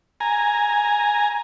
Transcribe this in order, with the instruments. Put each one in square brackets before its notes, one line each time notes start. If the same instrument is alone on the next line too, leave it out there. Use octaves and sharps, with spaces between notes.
[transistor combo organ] G#5 A#5